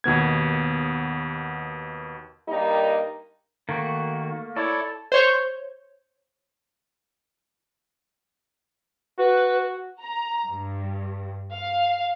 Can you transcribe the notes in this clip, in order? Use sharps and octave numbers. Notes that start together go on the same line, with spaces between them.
D#2 B2 B3 G#6
G2 G3 A#3 D#4
D#3 A3 A#3 F#4
E4 A4 C#5 D5
C5 C#5 G6
F#4 B4
A#5
G2
F5